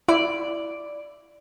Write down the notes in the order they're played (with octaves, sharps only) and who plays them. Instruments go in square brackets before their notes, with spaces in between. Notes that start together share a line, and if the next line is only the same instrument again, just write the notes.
[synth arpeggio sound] E4 [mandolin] D5